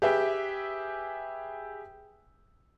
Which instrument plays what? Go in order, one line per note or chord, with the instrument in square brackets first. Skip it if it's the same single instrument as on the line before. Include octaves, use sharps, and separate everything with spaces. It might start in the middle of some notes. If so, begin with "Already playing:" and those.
[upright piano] G4 G#4 B4 E5 G5